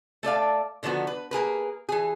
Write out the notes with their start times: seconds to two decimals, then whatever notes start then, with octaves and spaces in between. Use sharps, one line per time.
0.23 A3 A4 D5 F5
0.83 D3 D#3 F3 B3 F#4
1.07 B4
1.31 A#3 G#4 A#4 B4
1.89 E3 G#4